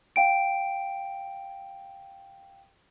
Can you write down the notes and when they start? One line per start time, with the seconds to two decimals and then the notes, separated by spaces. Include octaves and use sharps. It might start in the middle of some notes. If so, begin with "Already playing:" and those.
0.16 F5 G5 D7